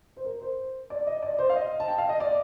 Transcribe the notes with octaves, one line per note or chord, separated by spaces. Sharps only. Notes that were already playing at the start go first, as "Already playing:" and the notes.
C5
A#4
C5
D5
D#5
D5
C5
F5
D#5
A5
G5
F5
D#5
D5